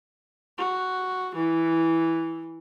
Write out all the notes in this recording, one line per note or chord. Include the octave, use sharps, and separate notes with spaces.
F#4
E3